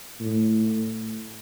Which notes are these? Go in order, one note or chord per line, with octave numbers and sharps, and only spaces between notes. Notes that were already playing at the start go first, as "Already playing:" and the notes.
A2